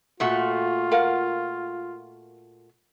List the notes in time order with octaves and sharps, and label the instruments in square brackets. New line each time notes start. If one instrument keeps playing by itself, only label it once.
[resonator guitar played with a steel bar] A#2 A3 F#4 [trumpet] F4
[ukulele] A#4 F5 F#5